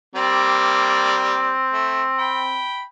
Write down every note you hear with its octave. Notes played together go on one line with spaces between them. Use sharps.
G3 A#3 C4 D5
A3
G5 B5